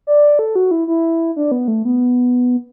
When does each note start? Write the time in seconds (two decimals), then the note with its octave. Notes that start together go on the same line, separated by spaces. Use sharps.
0.07 D5
0.39 A4
0.55 F#4
0.71 E4
0.88 E4
1.36 D4
1.52 B3
1.68 A3
1.85 B3